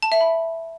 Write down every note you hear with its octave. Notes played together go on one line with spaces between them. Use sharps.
A5
E5
B5